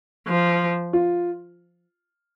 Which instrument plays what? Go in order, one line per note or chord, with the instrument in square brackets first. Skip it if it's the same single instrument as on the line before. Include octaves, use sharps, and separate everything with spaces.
[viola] F3
[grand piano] F4